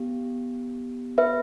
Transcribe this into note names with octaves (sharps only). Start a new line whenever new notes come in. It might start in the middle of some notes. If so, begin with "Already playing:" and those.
Already playing: B3 G4
B4 E5